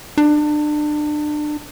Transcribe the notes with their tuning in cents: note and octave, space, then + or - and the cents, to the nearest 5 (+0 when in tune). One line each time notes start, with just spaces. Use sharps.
D4 +30